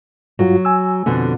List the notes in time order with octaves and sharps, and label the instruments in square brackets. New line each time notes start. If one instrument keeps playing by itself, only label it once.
[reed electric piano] G2 F4 F#4 [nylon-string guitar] F#3
[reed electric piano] G#5 E6
[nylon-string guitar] F2 B2 D3